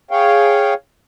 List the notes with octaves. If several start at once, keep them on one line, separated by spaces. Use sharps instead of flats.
G#4 C#5 F5 G5